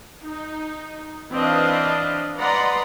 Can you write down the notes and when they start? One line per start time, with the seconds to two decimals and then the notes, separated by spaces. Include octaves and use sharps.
0.24 D#4
1.32 E3 C4 D4 B4 D#5 F5
2.39 B4 D5 D#5 F#5 A#5 C6